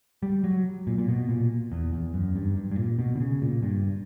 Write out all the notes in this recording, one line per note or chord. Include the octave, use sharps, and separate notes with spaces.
G3
F#3
A#2
A#2
B2
A#2
E2
E2
F#2
G2
G2
G2
A#2
B2
D3
C#3
A#2
G2